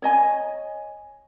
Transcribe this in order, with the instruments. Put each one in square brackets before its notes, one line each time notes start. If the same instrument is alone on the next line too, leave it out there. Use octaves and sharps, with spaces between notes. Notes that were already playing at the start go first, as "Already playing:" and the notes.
[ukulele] C#5 D#5 G#5